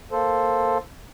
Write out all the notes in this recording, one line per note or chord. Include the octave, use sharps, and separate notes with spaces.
A#3 A4 C5